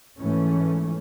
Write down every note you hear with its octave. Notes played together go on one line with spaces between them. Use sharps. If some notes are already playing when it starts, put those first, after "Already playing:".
G#2 E3 A3 C#4